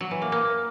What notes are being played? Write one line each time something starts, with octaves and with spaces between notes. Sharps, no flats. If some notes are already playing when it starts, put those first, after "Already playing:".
F#3
E3
A#3
A#3